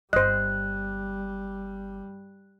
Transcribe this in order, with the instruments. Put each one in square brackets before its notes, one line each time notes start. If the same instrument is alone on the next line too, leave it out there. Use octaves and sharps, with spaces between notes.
[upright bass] G1 [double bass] G3 [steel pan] C5 D#5 [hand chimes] F#6